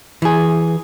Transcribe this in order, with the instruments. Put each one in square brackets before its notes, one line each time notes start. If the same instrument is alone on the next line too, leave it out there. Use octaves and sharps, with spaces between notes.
[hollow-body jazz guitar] E3 G#4